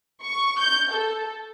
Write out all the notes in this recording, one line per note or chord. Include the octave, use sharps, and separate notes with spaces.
C#6
G6
A4